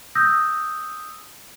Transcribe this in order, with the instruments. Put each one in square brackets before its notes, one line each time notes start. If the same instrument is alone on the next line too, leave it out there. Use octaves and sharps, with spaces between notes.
[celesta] D#6 E6 G6 A#6